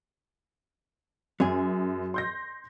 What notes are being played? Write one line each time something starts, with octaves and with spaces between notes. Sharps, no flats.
F#2 F#3 G#4
C6 G6 A#6